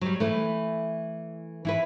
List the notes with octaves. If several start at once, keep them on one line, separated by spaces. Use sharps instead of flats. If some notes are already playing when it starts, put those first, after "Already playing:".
F#3 G3
E3 A3
E3 E4 B4